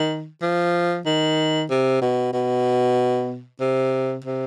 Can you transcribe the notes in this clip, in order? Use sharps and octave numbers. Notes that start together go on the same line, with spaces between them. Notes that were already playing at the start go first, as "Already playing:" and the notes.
Already playing: D#3
F3
D#3
C3
B2
B2
C3
C3